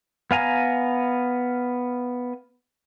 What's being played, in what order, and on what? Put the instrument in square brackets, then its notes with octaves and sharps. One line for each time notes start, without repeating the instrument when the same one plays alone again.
[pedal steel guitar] B3 F5 G#5 A#5